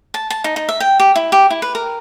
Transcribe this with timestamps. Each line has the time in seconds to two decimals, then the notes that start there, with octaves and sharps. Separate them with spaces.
0.14 A5
0.30 A5
0.44 D#4
0.56 D#4
0.69 E5
0.80 G5
1.00 G4
1.16 E4
1.32 G4
1.50 E4
1.62 B4
1.75 A#4